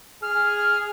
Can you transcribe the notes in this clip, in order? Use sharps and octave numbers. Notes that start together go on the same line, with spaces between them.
G#4 F6